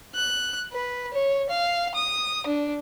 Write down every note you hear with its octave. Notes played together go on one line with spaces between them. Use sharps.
F#6
B4
C#5
F5
D#6
D4